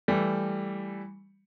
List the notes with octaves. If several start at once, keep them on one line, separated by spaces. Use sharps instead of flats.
E3 G3 A3